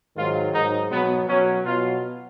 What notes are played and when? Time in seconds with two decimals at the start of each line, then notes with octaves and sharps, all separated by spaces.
0.16 G#2 D#3 F#3 F4
0.54 G#2 F#3 D#4
0.91 B2 F#3 B3
1.28 B2 F#3 C#4
1.65 B2 F#3 F4